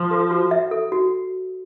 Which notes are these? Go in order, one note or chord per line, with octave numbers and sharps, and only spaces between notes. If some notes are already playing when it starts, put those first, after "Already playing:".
Already playing: F3
A4
F#4
E5
A4
F#4